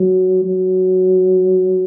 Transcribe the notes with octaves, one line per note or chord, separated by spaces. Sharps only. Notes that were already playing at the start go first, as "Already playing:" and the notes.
Already playing: F#3
F#3